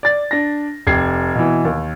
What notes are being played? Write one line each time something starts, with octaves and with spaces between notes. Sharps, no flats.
D5 A6
D4 A#6
F1 G4 G#6 C7
B2 E3
D#2